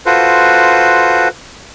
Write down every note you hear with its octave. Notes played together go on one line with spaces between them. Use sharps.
F4 F#4 A4 B4 C5